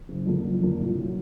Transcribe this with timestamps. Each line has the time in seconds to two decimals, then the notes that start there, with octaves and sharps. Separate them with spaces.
0.09 F#1
0.26 F2 D3 F3 A#3
0.44 F#1
0.62 F2 D3 F3 A#3
0.79 C2
0.97 A#2 F#3